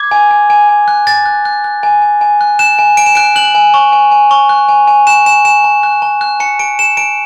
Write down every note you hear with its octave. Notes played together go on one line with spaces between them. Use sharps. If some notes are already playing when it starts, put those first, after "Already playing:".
Already playing: D6 G#6
G#5
G#5
G#5
G#5
F#6
G#5 A6
F#6
F#6
F#6
G#5
G#5
G#5
F#6
F#6 E7
G#5
G#5 D7
E7
F#6 D7
F#6 F#7
G#5
C#6
G#5
G#5
C#6
F#6
G#5
G#5
F#6 E7
G#5 E7
G#5 E7
A5
F#6
A5
F#6
A5 C#7
A5 D7
A5 E7
A5 D7